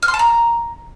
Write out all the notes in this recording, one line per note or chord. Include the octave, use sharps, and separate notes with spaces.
F6
C6
A5
A#5